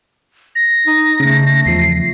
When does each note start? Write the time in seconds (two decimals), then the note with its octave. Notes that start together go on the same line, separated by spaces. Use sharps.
0.56 A#6
0.87 D#4
1.20 C#3 A3
1.66 E2 F3 C7